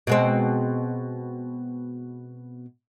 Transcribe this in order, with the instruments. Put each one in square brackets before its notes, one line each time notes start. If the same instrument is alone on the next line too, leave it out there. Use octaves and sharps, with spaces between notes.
[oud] B2 G#3 C4